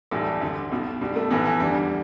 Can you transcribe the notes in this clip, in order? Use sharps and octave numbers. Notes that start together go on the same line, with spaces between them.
B1 A2 E3 G3
G3
D2 D3
B1 B2
B1 B2 G3
A3
B1 A2 E3 B3
E3
E2 D3 G3
G3